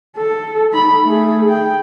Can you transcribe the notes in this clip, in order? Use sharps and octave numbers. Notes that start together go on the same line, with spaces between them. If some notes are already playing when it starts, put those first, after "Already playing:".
A4
D#4 B5
A3 G#4
G5